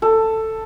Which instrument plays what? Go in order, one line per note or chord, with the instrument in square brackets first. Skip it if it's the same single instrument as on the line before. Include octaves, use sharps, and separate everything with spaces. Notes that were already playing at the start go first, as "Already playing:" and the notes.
[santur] A4